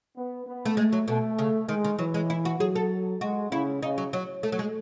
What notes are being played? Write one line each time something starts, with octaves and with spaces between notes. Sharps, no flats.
B3
B3
A3
G#3 A3
F#3
B2 A3
C#3
D#3 G#3
D#3
E3 F#3
G#3
E4
F#4
F#3 G#4
A4
G#3 F#4
C#3 E4
C#3 D#4
F#3
F#3
A3
F#3
G#3